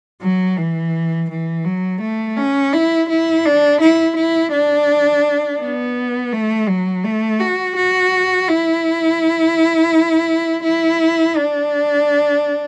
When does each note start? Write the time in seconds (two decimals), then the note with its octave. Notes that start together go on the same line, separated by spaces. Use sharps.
0.22 F#3
0.57 E3
1.30 E3
1.65 F#3
2.01 A3
2.37 C#4
2.73 E4
3.09 E4
3.45 D4
3.81 E4
4.16 E4
4.52 D4
5.60 B3
6.33 A3
6.68 F#3
7.05 A3
7.40 F#4
7.76 F#4
8.48 E4
10.64 E4
11.36 D4